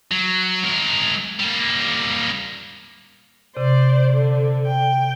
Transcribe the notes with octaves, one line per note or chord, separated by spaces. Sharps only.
F#3
G#3 A#4
G3 A#3
C3 C5 D5
D3
G5